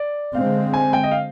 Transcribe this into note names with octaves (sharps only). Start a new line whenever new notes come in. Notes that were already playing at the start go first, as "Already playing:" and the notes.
Already playing: D5
D3 G#3 C4 F5
G#5
G5
D#5
F5